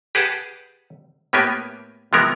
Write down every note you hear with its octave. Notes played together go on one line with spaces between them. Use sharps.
G4 G#4 B4 F#5 A5
A2 A#3 B3 G4 G#5
C3 E3 F3 G#3 B3 A#4